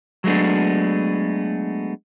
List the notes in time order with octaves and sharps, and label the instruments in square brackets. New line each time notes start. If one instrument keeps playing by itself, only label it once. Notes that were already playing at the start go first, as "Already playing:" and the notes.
[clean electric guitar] F#3 G#3 A3 B3 D4